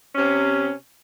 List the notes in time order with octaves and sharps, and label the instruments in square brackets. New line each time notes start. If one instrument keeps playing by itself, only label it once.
[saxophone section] C3 C#4